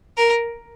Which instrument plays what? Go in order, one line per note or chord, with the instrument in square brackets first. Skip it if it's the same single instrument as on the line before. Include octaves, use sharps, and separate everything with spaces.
[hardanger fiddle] A#4